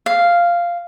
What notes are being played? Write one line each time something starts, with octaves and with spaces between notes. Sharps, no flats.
F5